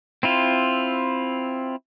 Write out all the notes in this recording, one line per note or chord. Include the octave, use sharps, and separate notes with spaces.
C4 E4 F4